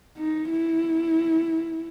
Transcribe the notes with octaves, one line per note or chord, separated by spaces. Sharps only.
D#4
E4